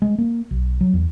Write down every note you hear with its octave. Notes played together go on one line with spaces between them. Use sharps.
G#3
A#3
B1
F#3
E2